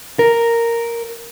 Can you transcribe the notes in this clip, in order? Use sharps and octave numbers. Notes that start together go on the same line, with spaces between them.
A#4